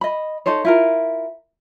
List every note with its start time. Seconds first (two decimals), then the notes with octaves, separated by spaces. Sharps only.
0.01 D#5 B5
0.46 D#4 A4 C5 C#5
0.65 E4 F4 A#4